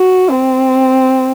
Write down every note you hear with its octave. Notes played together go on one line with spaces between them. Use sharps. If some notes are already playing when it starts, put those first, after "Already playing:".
Already playing: F#4
C4